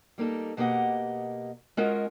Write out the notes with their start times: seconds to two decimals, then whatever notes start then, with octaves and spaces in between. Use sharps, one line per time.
0.18 G3 A#3 D#4 A4
0.57 B2 A#3 G4 D#5 F#5
1.77 G#3 C#4 F4 F#4 A#4 D#5